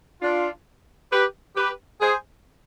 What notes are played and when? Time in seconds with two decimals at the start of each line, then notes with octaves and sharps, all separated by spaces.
0.22 D4 F4
1.12 G4 B4
1.56 G4 B4
2.01 G#4 C5